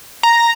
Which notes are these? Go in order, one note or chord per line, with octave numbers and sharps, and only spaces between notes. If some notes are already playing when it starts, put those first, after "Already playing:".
A#5